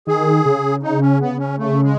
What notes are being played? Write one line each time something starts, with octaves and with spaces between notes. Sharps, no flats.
D#3 G#4
C#3
D#4
C#4
B3
C#4
A3
G#3